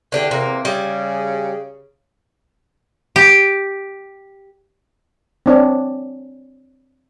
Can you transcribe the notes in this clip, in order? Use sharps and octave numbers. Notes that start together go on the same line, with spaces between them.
E2 D3 D4 G4
C3 A#3
C#3 G3 G#4
G4
C4 D4 C#5